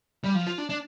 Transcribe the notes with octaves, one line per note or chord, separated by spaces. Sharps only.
G3
F3
F4
D4
D4